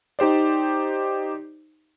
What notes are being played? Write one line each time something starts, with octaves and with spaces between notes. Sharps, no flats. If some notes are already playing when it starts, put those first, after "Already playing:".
D#4 G4 C5 D5